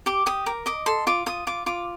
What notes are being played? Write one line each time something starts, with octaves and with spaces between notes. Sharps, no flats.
G4 D6
G4 D#6
A#4 D6
D#5 D6
A4 C6
F4 D6
F4 D#6
F4 D6
F4 D6